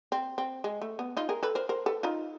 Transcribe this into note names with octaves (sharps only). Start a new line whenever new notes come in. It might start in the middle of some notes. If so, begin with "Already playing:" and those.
C4
C4
G#3
A3
B3
D#4 F4
G#4 A#4
A4 B4
A#4 C5
A#4 C5
A4 B4
D#4 F4